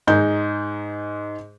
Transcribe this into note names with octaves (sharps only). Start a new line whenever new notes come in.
G#2 G#3 D#4 G6